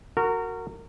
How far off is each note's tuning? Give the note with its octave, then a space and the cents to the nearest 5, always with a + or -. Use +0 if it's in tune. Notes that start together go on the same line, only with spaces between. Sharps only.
F#4 +0 A#4 -25